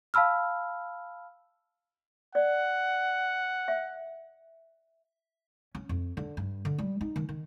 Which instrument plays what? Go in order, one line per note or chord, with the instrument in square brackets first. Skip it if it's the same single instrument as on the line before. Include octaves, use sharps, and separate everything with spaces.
[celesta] F5 A5 B5 E6 F6
[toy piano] D5 [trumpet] F#5
[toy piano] E5
[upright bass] C#4
F2
D3
G2
D3
G3
D#4
D#3
D#3